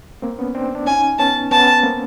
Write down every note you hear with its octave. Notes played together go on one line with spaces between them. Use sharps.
A#3 C4
B3 C#4
C4 D4
D4
C#4 D#4 G#5
B3 C#4 A5
B3 C#4 A5
A#3 C4